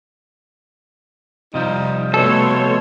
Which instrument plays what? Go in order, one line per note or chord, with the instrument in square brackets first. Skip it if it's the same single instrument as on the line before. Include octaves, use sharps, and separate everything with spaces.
[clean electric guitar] C3 F3 G3 [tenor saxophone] D#4
[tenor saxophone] B2 [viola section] A3 C#5 C6 [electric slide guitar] A4